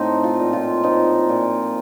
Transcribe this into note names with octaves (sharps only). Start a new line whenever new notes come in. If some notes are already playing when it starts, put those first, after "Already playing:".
Already playing: A2 A3 C4 D#4
F4
A#2
F4
F3 D#4
A#2